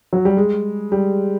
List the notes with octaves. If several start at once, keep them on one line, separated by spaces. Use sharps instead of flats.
F#3
G3
G#3
G3